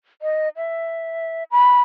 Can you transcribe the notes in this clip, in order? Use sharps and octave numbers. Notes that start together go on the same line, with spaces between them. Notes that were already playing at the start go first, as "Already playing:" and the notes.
D#5
E5
B5